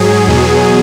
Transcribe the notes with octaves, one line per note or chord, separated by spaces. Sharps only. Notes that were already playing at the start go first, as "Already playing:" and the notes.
Already playing: G#2 F#3 G#4
E2 B2 F#3